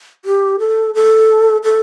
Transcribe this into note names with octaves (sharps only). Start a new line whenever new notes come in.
G4
A4
A4
A4